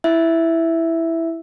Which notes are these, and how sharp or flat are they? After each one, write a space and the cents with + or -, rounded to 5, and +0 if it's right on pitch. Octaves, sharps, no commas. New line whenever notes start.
E4 +0 E5 +0